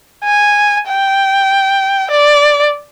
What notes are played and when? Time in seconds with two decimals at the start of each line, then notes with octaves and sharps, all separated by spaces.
0.24 G#5
0.89 G5
2.11 D5